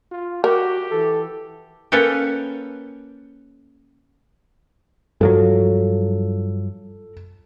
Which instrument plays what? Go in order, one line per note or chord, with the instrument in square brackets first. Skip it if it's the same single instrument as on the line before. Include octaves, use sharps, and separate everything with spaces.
[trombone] F4
[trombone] F#4 [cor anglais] G4 [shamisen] A#4
[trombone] E3 [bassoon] A4
[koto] A#3 C#4 A4 B4 C#5 G5
[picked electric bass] G2 F3 F#3 [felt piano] A4